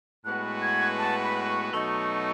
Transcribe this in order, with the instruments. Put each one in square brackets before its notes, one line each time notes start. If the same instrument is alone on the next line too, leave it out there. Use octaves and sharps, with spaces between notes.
[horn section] A2 G#3 B3 F#4 B4 [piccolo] F#6
[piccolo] G#6
A5
B5
C#6
[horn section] B2 F#3 A3 D#4 [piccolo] C#6